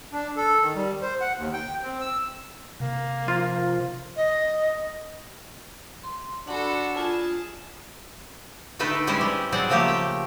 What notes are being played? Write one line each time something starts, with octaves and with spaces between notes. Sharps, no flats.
D4
A4
D#3
G3
C5
F#5
D#2
G5
C4
E6
C3 A#3
F3 F4
D#5
C6
D4 F#4 A4 F#5 B5
F4 G#4 A5
D3 A3 D#4 A4 B4 G5
G3 G#3 C#4 E4 B4 C5
G3
F#3 G3 C4 G#4 D5 F#5
C#3 F3 A3 A#3 G4
G5